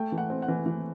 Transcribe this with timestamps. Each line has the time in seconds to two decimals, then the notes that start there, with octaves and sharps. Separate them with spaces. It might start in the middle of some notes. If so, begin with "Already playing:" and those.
Already playing: A3 G5
0.12 E3
0.18 F#5
0.30 C4
0.42 F#5
0.48 E3
0.66 E3